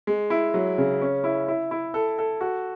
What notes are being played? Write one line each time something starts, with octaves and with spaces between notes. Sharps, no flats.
G#3
E4
F#3
C#3
C#4
E4
E4
E4
A4
A4
F#4